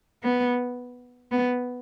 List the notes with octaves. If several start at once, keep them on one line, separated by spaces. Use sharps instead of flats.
B3
B3